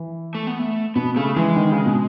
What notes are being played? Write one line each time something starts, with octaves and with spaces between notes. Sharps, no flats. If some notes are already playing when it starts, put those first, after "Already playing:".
Already playing: E3
A3
B3
A3
B2 B3
C#3 A3
E3 G#3
D#3
C#3
B2